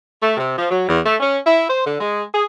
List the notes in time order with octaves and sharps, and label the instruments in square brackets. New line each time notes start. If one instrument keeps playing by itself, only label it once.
[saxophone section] A3
C3
F3
F#3
E2
A3
C#4
E4
C5
D3
G#3
G#4